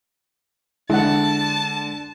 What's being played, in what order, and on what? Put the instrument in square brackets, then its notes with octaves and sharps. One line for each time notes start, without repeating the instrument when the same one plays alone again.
[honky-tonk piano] D3 [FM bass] G#3 [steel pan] E4 F#5 [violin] A5